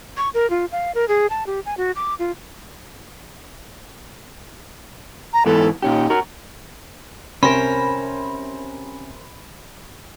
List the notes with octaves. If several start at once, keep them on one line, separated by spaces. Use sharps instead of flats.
C#6
A#4
F4
F5
A#4
G#4
A5
G4
G#5
F#4
D6
F4
A#5
G#2 E3 B3 A4
A#2 C#4 D#4 G4
F#4 A#4
C2 C3 C#4 A#4 C5 G5 B5